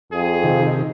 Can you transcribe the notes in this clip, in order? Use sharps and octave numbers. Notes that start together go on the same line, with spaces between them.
F2 G#4
C3 D#3